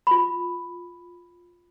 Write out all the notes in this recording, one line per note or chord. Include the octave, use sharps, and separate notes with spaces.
F4 B5